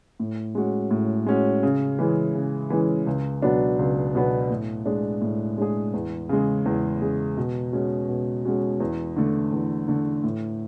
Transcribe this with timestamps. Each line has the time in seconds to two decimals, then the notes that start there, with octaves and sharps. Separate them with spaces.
0.20 A2
0.55 G#3 C#4 F#4
0.91 A2
1.26 G#3 C#4 F#4
1.63 C#3
1.99 E3 G#3 C#4 E4
2.35 C#3
2.70 E3 G#3 C#4 E4
3.06 C#2
3.42 B2 F#3 B3 D4
3.79 C#2
4.15 B2 F#3 B3 D4
4.50 A2
4.86 G#3 D4 G#4
5.21 A2
5.58 G#3 D4 G#4
5.94 E2
6.29 C#3 G#3
6.66 E2
7.02 C#3 G#3
7.37 B2
7.72 G#3 C#4 F#4
8.09 B2
8.45 G#3 C#4 F#4
8.80 E2
9.16 D3 A3
9.52 E2
9.88 D3 A3
10.24 A2